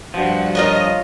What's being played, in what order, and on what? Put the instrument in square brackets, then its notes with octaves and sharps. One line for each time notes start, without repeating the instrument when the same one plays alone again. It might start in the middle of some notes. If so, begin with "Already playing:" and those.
[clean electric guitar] G2 F3 [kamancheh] F#4
[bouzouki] F4 A#4 C#5 [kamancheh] D#5